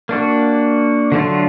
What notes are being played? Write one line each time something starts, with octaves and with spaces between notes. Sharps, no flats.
A#3 D4 F#4
D3 F#3 A3 D4 F4